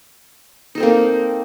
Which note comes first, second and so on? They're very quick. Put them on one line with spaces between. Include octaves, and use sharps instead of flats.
D#4 A4 C4 A#3